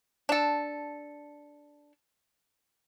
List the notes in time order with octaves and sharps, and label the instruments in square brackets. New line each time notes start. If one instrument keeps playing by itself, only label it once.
[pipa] D4 A4